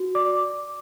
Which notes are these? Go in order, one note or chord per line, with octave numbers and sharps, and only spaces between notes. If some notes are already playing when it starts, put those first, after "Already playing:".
Already playing: F#4
D5 D6